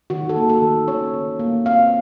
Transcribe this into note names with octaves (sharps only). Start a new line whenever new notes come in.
D#3 F#4
A4
A#3
A4
D#3
C#4 C#5
D#3
A#3
C4 F5